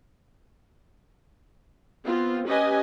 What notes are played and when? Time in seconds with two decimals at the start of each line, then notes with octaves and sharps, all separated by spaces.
2.05 B3 C4 F4
2.46 C#4 G4 B4 D#5 G#5